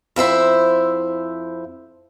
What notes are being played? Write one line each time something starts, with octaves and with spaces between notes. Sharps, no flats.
F2 E4 C5 E5